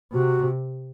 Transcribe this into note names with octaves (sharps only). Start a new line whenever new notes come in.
C3 F#4